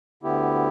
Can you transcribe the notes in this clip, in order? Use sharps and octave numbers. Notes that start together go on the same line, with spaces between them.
D2 D3 B3 E4 G4